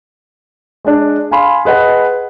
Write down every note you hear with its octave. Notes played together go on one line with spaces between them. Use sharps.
G#3 D4
F5 G#5 B5 C6
G#4 B4 D#5 F#5